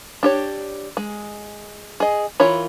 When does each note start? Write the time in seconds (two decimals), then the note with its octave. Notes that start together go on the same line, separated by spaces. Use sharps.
0.23 D4 G4 C#5
0.97 G#3
2.00 G#4 D#5
2.40 E3 F4 A#4 C#5 B5